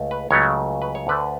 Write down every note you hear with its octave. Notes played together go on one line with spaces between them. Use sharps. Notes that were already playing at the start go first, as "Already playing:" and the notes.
Already playing: C#2 A3
B4
C#2 C#3 F#3 A3 C#5
B4
C#5
D2 D3 A3 B4